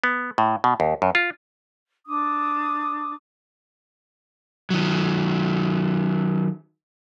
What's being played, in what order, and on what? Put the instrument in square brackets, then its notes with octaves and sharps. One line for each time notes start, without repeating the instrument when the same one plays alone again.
[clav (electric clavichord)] B3
A2
B2
D#2
F#2
F4
[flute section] D4 D6 D#6
[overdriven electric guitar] D#3 F#3